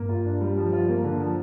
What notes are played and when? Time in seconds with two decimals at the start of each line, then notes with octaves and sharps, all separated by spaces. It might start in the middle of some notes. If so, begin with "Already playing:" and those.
Already playing: G2 A#3
0.09 F4
0.25 D4
0.41 G3
0.57 F3
0.73 F4
0.89 A#3
1.04 D3
1.20 F3